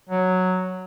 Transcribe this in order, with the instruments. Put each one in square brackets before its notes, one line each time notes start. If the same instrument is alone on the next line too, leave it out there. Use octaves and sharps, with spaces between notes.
[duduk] F#3